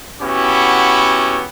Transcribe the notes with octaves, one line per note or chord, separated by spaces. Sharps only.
B3 C#4 E4 F#4 G4